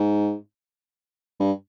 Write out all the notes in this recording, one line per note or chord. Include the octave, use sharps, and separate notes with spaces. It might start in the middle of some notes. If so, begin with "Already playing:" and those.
Already playing: G#2
G2